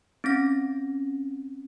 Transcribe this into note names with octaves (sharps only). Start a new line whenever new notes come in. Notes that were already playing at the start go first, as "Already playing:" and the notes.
C4 C#4 A#6